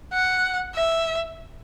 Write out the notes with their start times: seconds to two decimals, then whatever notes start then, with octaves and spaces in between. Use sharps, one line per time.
0.13 F#5
0.75 E5